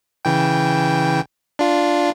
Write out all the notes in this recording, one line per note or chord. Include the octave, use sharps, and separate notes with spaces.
C#3 E3 G5
D4 F4